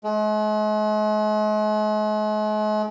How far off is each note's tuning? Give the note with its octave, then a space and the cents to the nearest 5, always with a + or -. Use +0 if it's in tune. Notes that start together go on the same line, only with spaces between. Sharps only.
G#3 +45